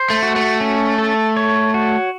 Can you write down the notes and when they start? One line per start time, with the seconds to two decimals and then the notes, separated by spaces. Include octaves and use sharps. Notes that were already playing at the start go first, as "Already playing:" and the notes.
Already playing: C5
0.10 A3
0.23 F#4
0.36 A3
0.61 C#4
0.98 A4
1.37 C#5
1.74 F#4